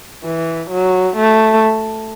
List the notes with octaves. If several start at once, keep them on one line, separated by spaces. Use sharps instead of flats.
E3
F#3
A3